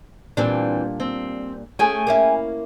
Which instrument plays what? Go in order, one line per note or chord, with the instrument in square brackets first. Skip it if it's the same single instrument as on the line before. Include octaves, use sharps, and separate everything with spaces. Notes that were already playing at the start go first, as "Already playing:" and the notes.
[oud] A#2 G3 D4 [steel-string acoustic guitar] E3 C4
[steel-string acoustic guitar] C4
[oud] A3 C#4 [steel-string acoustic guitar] G#4 G5 G#5
[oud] A#3 C#4 E4